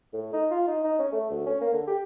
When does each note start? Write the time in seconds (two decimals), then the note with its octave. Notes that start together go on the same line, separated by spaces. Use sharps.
0.13 A2
0.33 D#4
0.51 F4
0.67 D#4
0.84 D#4
0.99 C#4
1.13 A3
1.31 D2
1.46 C#4
1.61 A#3
1.73 D3
1.87 G4